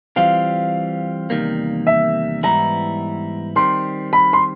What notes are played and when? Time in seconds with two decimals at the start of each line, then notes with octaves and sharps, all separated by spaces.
0.16 E3 G3 C4 F4 F5
1.30 E2 C3 D#3 G3 A#3
1.87 E5
2.43 G#2 E3 G3 B3 E4 A#5
3.56 D#3 G3 C4 C6
4.13 B5
4.33 C6